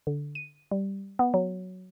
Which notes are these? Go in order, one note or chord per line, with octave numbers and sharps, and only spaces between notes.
D3
D#7
G3
B3
F#3